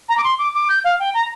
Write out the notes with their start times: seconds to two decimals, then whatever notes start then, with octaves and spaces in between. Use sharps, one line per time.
0.09 A#5
0.17 D6
0.24 C6
0.38 D6
0.54 D6
0.69 G6
0.84 F5
1.00 G5
1.14 A#5